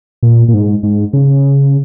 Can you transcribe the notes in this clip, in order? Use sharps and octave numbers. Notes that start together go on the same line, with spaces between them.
A#2
A#2
G#2
G#2
C#3